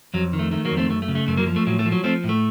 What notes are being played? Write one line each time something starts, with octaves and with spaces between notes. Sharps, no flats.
F2 F#3
D#3
A3
D#3 A3
F#3 A#3
F2
A3 C4
F#2 A3
A3
C#3
A3
F#2 A3
F#3 A#3
F3
A3
A2 F#3
A3
F3
F#3
F3 A3 C4
A2
A3